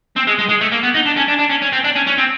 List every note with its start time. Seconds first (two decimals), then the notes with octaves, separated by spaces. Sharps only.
0.16 C4
0.27 G#3
0.39 G#3
0.49 G#3
0.61 A3
0.72 A#3
0.83 B3
0.94 D#4
1.06 D4
1.17 C#4
1.28 D4
1.39 D4
1.50 C#4
1.62 C#4
1.73 C4
1.84 D4
1.95 C#4
2.07 C#4
2.18 C4